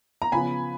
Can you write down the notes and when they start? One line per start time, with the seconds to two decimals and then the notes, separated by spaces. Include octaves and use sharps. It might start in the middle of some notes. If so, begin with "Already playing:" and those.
0.22 A#5
0.32 C#3 F3 B3 G#5 B5